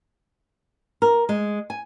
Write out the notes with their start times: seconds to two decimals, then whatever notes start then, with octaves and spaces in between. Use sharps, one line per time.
1.02 A#4
1.29 G#3
1.70 G#5